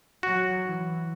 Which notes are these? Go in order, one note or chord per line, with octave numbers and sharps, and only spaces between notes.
F#3 F#4
E3